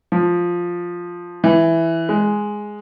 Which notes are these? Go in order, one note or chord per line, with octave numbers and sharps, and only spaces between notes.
F3
E3
G#3